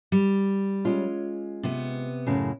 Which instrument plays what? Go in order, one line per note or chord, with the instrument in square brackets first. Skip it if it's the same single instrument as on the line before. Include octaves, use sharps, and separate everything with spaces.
[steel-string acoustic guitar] G3
[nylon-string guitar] G#3 C#4 F4
[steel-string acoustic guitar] C3 B3
[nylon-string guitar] F#2 A2 C#3